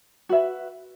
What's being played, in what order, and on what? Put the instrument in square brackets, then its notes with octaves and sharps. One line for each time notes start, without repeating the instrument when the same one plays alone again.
[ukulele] F#4 B4 E5